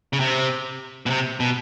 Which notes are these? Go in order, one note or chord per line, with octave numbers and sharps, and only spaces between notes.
C#3
C3
B2
C3
B2